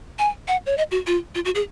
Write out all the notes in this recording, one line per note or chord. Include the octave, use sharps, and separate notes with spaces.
G#5
F#5
C#5
D#5
F#4
F4
F4
F#4
G#4